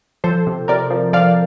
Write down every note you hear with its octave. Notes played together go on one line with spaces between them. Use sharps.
F3 A4 C5
C3
C3 A#4 D5
F3
F3 D5 F5